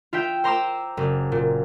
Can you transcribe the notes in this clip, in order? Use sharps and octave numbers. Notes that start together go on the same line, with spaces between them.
F4 E5 G5 G6
C5 A#5 C6 D6 E6
F#1
A#2